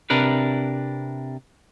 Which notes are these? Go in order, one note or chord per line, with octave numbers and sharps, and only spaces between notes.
C3 D4 A#4 B4